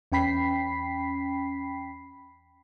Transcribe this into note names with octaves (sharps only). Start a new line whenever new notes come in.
E2 C#4 G5 B5 B6 C7